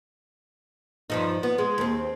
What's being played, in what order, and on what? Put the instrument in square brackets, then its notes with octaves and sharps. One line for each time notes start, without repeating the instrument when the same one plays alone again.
[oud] G2 F3 D#4
B3
G#3
D#2 C4